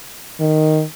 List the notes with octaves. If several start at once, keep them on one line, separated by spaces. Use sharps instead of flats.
D#3